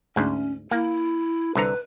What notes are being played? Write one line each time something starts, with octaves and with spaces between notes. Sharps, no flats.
D2 G#2 C#4
A#3 E4
C2 D3 B4 A#5